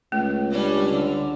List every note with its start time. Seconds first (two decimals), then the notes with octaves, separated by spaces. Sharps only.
0.12 C#2 A3
0.50 G3 C#4 D4
0.91 D3